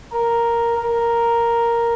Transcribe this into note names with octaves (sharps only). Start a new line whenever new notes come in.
A#4
A#4